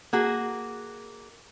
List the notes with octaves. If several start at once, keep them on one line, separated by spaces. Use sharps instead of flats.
A#3 F#4 G#4